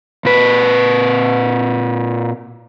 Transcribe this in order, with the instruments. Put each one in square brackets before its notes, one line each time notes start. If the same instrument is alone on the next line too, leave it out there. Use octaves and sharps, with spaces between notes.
[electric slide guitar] A#2 B4